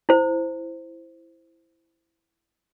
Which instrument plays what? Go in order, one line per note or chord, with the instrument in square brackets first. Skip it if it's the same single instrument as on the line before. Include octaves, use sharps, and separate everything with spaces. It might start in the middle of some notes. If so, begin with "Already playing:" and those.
[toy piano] E4 C5